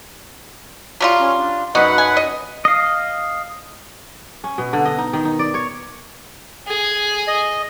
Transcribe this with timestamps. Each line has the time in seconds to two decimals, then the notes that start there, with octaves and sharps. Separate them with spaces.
1.00 F#3 G3 F4
1.19 C#4
1.39 D4
1.75 F#2 D#4 F#4 B4 F#5
1.98 G#5
2.17 D#5
2.65 D#5 F5
4.44 C#4
4.58 B2
4.73 D3
4.85 D#5
4.98 D#4
5.13 D#3
5.25 D#4
5.39 D5
5.54 C#5
6.67 G#4 G#5
7.27 D#5